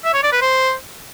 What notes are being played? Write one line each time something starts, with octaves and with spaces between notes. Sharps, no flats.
E5
C#5
D5
B4
C5